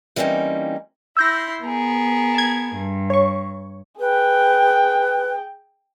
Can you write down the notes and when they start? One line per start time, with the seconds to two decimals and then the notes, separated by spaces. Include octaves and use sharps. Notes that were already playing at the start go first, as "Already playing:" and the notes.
0.16 E3 G3 A#3 C4 C#4 D#4
1.17 E4 C6 E6 G6 A#6
1.63 B3 G#4 A#4
2.35 A5 G#6
2.76 G2
3.10 C#5 C#6
4.00 G#4 B4 G5